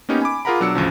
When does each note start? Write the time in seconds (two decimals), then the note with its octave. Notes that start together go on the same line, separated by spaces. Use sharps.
0.09 A#3 B3 C#4 D#4 G4
0.22 G#5 B5 D6
0.45 F4 G#4 A#4 F#5 A#5 B5
0.60 B2 F#3 D4 E6 C#7
0.75 A1 D2 C#3 F3